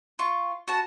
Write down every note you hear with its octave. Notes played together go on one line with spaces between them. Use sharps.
F4 C#6
F#4 A5